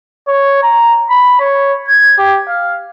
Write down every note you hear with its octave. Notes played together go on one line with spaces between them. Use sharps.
C#5
A#5
B5
C#5
G#6
G4
F5